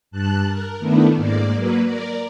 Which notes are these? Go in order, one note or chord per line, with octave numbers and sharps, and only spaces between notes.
G2 A5 F#6
A#4
D#3 A3 B3 D4 E4
G#2 A#3 D5
F#3 A#3 B4
A#4 D5